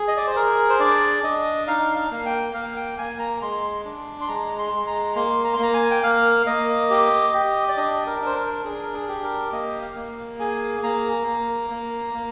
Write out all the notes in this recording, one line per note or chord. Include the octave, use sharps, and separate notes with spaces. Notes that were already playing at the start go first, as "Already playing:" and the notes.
Already playing: G#4
D#5
D5
C5
G#4 A#4
C5
D4 D5
D4 D#5
D#4 F5
F5
A#3
G5
A#3 F5
G5
A#3 G#5
A#5
G#3 C6
D4
C6
G#3 A#5
C6
G#3
A#5
A#3 C6
A#5
C6
A#3 A#5
G#5
G5
A#3 F5
A#3 D#5
G4
G4
D5
D4 D#5
A#4
D4 C5
A#4
D4 G#4
A#4
G#4
G4
A#4
A#3 D#5
F5
A#3
G#4 G#5
A#3 A#5
A#3
A#3
A#3